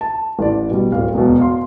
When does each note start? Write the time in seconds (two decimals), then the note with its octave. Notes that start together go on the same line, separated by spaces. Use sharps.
0.01 A5
0.39 A1 D5
0.71 B2 G3
0.92 D1 F5
1.14 E1 B2
1.40 F5 C6